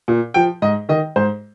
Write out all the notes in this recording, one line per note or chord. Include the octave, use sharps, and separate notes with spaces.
A#2
F3 G5
G#2 D#5
D#3 D#5
G#2 C5